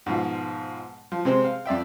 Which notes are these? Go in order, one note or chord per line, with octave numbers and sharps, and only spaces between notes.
G#2 B2 F3
F3
C3 G#3 C4 C5
F5
F2 D5 E5 G5